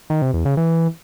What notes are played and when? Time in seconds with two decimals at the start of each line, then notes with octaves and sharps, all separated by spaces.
0.10 D#3
0.22 C3
0.34 E2
0.45 C#3
0.57 E3